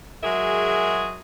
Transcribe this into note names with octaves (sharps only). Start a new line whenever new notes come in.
F#3 G#3 F#4 G#4 A#4 E5